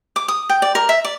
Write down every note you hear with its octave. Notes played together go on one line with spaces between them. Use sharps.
D6
D#6
G5
D5
A#4
E5
D5